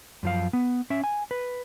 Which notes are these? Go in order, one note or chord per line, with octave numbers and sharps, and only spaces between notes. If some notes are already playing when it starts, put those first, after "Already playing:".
F#2 F3 F5
B3
C#4 E5
G#5
B4